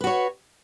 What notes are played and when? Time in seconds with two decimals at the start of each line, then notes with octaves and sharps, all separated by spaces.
0.01 B4
0.04 F#4
0.07 C#5